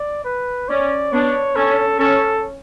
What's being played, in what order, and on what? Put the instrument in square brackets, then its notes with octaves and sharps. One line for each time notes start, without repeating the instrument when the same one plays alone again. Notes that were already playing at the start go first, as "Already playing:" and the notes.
Already playing: [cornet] D5
B4
[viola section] C#4 [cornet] D5
[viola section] B3 D4 [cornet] C#5
[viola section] C#4 [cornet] A4
[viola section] C#4 [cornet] A4